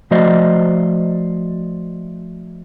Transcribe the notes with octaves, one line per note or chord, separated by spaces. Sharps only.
F3 A3 F#4 C5 D5 D#5